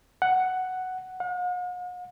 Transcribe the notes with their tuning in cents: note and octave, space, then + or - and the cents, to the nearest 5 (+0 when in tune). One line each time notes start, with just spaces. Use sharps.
F#5 +5
F#5 -45